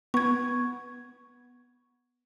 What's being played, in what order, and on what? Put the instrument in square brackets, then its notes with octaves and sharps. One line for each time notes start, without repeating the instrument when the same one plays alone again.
[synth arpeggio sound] B3 [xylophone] C#6 G#6